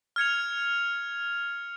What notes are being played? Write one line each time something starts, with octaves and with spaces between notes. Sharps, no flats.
F6 G#6 C#7 F7